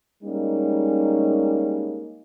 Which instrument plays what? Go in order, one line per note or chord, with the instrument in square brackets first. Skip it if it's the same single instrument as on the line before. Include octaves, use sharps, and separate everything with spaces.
[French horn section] G3 G#3 A#3 C#4 D#4